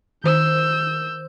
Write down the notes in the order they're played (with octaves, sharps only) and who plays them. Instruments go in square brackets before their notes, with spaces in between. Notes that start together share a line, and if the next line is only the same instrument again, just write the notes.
[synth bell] D#3 C5 [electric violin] E6 G6